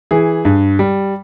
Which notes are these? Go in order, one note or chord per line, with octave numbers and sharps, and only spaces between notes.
E3 G#4
G2
G3